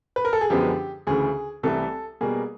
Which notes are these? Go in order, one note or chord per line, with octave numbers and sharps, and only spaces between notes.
B4
A#4
A4
G#4
F#2 D3 F3 G#3 B3 G4
D2 C#3 E3 G#4
C2 C3 E3 A3 A4
B2 G3 A#3 G#4